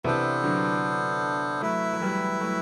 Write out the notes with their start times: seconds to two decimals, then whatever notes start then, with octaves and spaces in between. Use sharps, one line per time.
0.04 C3 E3 B3 D4 A4 C5
0.43 D3 F#3
1.61 F#3 A3 E4 B4 E5
1.93 F#3
2.01 E3 G3
2.40 F#3 A3